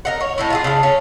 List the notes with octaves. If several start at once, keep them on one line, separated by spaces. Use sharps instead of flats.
A#4 D#5 F#5
C#5
A2 D#4 E4
F4 F#4 G#4
C#3 D4
C#4